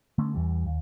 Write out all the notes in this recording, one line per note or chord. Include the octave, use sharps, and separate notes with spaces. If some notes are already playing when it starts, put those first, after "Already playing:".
D3 A3 B3 C#4
E2 E3 G3
D#2